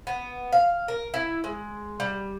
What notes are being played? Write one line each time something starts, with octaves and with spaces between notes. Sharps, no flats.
B3
F5
A#4
E4
G#3
G3